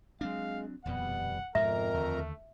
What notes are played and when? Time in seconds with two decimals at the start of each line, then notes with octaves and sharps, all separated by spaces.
0.21 F#3 G#3 C4 D4 F5
0.85 D#1 F2 B2 G3 B3 F#5
1.55 F2 G#2 B2 F3 A#4 E5 A#5
1.94 D#2 D3 A3